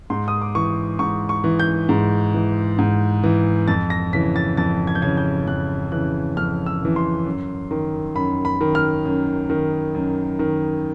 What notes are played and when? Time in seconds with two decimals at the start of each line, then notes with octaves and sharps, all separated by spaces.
0.10 G#2 C6
0.28 D#6
0.42 D6
0.55 E3 C#6
0.99 G#2 C#6
1.29 C#6
1.44 E3
1.60 G6
1.89 G#2
2.34 E3
2.79 G#2
3.24 E3
3.68 F2 A6
3.90 A#6
4.13 C#3 E3 B6
4.36 A6
4.57 F2 A6
4.87 G#6
4.95 G6
5.02 C#3 E3 G#6
5.17 G6
5.47 F2 F#6
5.92 C#3 E3 F#6
6.37 F2 F6
6.66 E6
6.81 C#3 E3
6.96 C6
7.26 F#2
7.71 D#3
8.16 F#2 B5
8.45 B5
8.61 D#3
8.75 F6
9.05 F#2
9.50 D#3
9.95 F#2
10.39 D#3